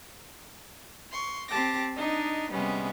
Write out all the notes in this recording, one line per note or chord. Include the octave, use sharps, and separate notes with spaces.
C6 C#6
C4 G4 A5 D6 A#6
D4 D#4 D#5
C3 G3 G#3 B3 C#4